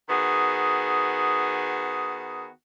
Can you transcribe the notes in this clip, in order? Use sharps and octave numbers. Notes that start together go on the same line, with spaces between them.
D#3 B3 F#4 G#4